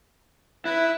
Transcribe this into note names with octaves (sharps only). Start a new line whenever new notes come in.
E4 B4